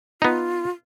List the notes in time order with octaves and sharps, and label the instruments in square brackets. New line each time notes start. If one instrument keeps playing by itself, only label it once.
[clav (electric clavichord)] B3 D#4 [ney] F4